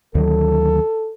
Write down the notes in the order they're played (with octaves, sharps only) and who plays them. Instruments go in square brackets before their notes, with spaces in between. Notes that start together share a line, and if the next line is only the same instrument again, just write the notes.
[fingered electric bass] D2 D#3 F#3 [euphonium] A4